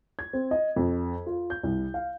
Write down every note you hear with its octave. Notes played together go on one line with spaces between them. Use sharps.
G#6
C4
D#5
F2
F4
G6
C2
F5